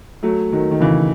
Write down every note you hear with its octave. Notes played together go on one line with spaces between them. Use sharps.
F#3 A3
D#3 F#3
D#3
C#3 E3